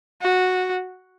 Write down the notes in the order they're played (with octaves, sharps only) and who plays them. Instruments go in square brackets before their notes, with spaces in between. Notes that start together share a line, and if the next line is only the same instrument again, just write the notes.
[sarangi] F#4